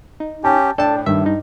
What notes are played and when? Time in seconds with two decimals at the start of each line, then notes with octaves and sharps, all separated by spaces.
0.20 D#4
0.44 C#4 G4 G5 A5
0.78 A2 D4 A4 D5 G5 A5
1.06 G2 D#3 E5
1.26 D#4